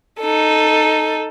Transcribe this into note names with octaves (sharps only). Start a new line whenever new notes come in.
D#4 A4